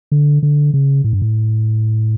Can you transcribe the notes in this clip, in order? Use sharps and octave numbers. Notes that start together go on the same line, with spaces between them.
D3
D3
C#3
A2
G2
A2